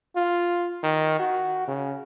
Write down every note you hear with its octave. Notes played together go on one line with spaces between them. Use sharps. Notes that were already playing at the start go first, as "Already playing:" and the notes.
F4
D#3
F#4
C#3